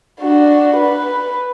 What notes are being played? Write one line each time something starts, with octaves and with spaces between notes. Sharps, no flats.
D4 F#4
B4